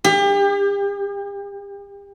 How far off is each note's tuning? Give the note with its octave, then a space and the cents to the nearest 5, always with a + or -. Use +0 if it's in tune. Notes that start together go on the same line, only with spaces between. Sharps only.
G4 +35